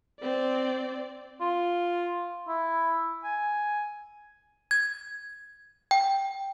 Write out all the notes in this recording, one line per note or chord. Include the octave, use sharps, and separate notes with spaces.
C4 D5
F4
E4
G#5
G#6
G5